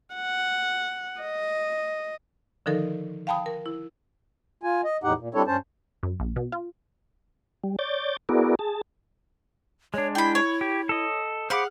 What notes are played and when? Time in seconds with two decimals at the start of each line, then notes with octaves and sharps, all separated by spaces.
0.15 F#5
1.21 D#5
2.66 D3 D#3 F3 D#4 A4 A#4
3.27 F5 G5 A5 B5 D#6
3.46 A#4
3.66 E4
4.63 F4 G#5
4.84 D#5
5.04 E2 A2 D#4 G4 F#5
5.18 A#2
5.34 G3 C4 D4 E4 A4 C#5
5.47 G2 C#4 C5 A5
6.03 F#2
6.20 A#1
6.36 B2
6.52 F4
7.64 G3
7.79 C#5 D5 G6 A6
8.29 B3 E4 F#4 G#4 A#4 D5
8.59 G#4 A5
9.94 G#3 D4 C#5
10.15 E4 G5 B5
10.35 C#5
10.61 G4
10.89 A4 D#5
11.50 G#4 C5 F5 F#5 B5 D6